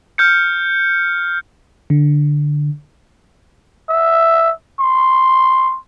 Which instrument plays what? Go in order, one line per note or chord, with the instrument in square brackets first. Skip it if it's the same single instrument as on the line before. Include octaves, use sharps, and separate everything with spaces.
[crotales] F6 G6 C#7
[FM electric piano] D3
[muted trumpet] E5
C6